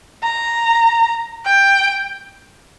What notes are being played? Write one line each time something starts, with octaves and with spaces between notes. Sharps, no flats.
A#5
G5